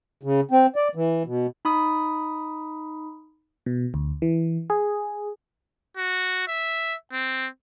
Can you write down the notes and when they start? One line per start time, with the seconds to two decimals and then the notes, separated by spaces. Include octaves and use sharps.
0.23 C#3
0.51 C4
0.76 D5
0.95 E3
1.26 B2
1.65 D#4 B5 D#6
3.66 B2
3.94 D2
4.22 E3
4.70 G#4
5.97 F#4
6.48 E5
7.13 C4